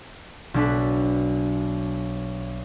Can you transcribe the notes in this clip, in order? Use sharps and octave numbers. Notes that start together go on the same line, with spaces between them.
B1 D4 B4